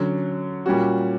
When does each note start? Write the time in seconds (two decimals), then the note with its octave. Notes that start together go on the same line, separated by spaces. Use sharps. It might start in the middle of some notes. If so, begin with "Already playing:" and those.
Already playing: D3 F#3 C#4
0.66 A#2 G3 C#4 F#4